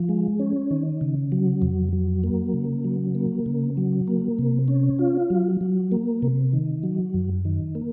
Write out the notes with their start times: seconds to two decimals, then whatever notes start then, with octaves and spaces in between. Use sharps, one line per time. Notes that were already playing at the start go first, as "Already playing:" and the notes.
Already playing: F3
0.09 G#3
0.39 C#4
0.71 D#3
1.01 C#3
1.32 F#3
1.62 F2
1.93 F#3
2.24 A#3
2.54 C#3
2.84 F#3
3.15 A#3
3.46 C#3
3.77 F#3
4.08 A#3
4.39 C3
4.68 C#4
4.99 F4
5.30 F#3
5.61 F#3
5.92 A#3
6.22 C3
6.53 D#3
6.83 F#3
7.14 F#2
7.45 D#3
7.75 A#3